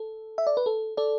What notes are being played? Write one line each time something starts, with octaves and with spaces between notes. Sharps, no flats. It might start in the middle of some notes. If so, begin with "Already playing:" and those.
Already playing: A4
E5
D5
B4
A4
A4 D5